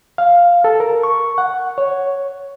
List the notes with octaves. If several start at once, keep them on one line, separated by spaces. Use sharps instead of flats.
F5
A4
A#4
C#6
F#5
C#5